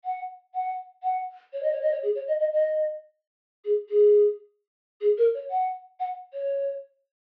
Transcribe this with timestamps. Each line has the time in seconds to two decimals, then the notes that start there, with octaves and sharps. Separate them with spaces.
0.04 F#5
0.54 F#5
1.02 F#5
1.52 C#5
1.62 D#5
1.71 C#5
1.81 D#5
1.91 C#5
2.02 G#4
2.15 C#5
2.27 D#5
2.39 D#5
2.52 D#5
3.64 G#4
3.89 G#4
5.00 G#4
5.17 A#4
5.34 C#5
5.50 F#5
5.99 F#5
6.33 C#5